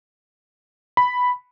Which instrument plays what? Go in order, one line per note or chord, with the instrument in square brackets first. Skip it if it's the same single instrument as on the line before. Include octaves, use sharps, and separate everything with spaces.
[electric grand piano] B5